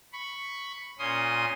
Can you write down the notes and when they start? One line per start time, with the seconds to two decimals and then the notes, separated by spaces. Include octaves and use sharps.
0.13 B5 C#6
0.99 A#2 C#4 C6 D#6